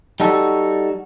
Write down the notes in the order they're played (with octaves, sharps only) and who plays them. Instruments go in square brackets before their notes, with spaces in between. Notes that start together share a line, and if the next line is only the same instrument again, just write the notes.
[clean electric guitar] G3 D#4 F#4 A4